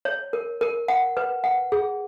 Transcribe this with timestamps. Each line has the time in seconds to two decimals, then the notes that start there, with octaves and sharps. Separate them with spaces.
0.05 C#5
0.33 A#4
0.61 A#4
0.88 F#5
1.17 B4
1.44 F#5
1.72 G#4